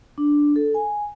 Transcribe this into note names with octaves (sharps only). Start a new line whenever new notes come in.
D4
A4
G#5